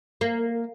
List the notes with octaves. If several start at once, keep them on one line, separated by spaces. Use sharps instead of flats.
A#3